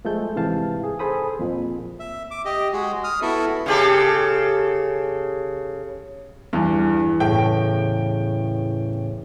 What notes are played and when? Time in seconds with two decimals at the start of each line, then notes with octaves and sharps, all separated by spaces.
0.05 F3 G#3 A3 A4 G6
0.36 G#2 C3 E3 F5 A5
0.84 G#4
0.99 G#4 A4 C5 B5 D#6
1.39 F2 A#2 F3
1.99 E5
2.31 D6
2.45 G4 D#5
2.73 G#3 F#4 G#4
3.04 D#6 F6
3.22 B3 E4 F#4 A4 E5
3.66 C#3 G4 A4
6.53 E2 G2
7.20 A2 C#3 G5